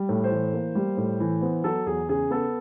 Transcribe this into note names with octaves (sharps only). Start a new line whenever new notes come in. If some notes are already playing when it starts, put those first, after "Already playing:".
Already playing: G3
A2
C5
E3
A#3
G3
A2
E3
B3 C5
F#3 A4
E2 G#4
C#3 G#4
B3 A4